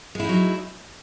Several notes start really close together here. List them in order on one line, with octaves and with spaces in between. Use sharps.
G#3 E4 D#4 F#3